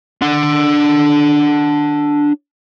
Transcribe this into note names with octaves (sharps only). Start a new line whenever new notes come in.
D4 F#5